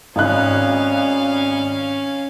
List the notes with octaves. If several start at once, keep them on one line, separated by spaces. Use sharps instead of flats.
G#1 C#4 D#5 F5 F#6